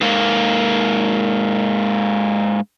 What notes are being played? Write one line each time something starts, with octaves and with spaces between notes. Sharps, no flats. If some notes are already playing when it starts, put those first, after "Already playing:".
G#2 A#3